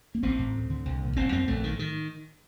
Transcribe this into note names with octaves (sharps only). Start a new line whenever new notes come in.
A#3
A1 C4
A2
D2
D3
C2
A#2
F#1 C4
F#2 C4
A#1 A3
A2 D#3
D#3